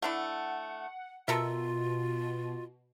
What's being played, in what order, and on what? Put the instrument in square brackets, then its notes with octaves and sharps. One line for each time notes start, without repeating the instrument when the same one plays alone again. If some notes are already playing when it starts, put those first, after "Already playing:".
[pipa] A3 D4 E4 [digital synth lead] F#5
[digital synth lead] B2 [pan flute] F4 [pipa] A4 A#4 E5